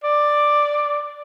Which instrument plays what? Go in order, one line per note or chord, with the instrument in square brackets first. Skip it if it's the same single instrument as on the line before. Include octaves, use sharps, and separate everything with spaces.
[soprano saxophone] D5